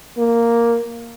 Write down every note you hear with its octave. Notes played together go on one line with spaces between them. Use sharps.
A#3